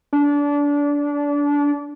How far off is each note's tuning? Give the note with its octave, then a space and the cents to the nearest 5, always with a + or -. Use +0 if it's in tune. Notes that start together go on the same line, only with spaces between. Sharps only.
D4 -25